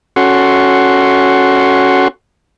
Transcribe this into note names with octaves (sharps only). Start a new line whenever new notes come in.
C#4 F#4 A4 F#5 C6 C#6